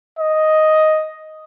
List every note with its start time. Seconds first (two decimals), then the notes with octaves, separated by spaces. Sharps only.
0.19 D#5